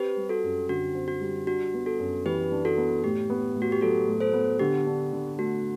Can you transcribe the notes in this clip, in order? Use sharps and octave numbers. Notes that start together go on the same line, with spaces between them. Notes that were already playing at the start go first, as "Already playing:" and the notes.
Already playing: C4 G4 B4
G3
F#4 A4
F#2
D3 F#4
C4
F#4
G3
D4 F#4
B3
F#4 A4
F#2
E3 G4 B4
D4
F#4 A4
B3
A2 G4
B3
A2
F#4
G4
F#3 F#4 A4
A2
A4 C5
B3
D3 G4
D4
D3
A3 F#4